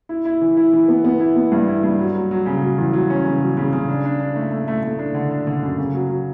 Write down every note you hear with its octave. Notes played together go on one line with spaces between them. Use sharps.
E4
E4
E3
E4
E3
B3
B3
E4
B3
G2
E4
G2
F#3
F#3
F#3
C#3
F#3
E2
F#3
C#4
C#3
F#3
C#3
C#3
D4
D4
D4
A3
A3
A3
A3
D4
D3
D4
D3
F#2
C#3
F#3
F#3